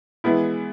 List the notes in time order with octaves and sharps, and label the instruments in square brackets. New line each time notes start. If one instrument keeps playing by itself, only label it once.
[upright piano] E3 G#3 B3 E4